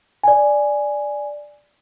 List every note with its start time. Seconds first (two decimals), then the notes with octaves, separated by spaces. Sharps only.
0.24 D5 G#5